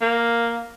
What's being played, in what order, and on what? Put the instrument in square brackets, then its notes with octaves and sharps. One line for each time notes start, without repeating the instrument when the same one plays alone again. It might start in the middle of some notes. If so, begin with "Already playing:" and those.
[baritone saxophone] A#3